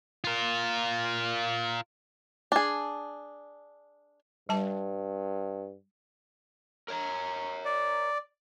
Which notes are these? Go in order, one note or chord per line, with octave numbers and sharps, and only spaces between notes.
F4 A#4
D4 G#4
G2 G3 A5
A#4 C#5 A#5
D5